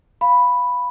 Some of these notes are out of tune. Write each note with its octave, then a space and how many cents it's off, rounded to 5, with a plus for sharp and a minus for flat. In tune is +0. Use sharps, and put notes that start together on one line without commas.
F5 +5 B5 +0